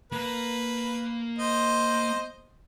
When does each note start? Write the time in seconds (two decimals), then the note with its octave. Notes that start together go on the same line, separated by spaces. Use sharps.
0.12 A#3 B4 A#5
1.38 C5 D#5